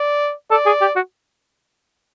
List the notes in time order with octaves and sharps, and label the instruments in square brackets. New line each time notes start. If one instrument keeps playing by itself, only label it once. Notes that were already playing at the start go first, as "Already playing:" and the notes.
Already playing: [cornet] D5
[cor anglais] A4 [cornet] D5
[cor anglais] G#4
G4
F#4